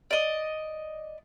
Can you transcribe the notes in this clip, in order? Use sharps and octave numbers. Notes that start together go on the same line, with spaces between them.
D5 D#5